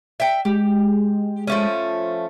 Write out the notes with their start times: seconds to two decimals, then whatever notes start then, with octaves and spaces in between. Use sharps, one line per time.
0.20 E5 G5
0.45 G#3 G4
1.47 F3 A3 C#4